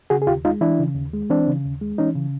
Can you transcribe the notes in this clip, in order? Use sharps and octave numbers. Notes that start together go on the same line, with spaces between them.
C#3 F#4 G#4
G#4
D#2 F4 G4
G#3 D#4 F4
E3 D4 E4
C#3
D#2
G#3
E3 C4 D4
C#3
D#2
G#3
E3 C#4 D#4
C#3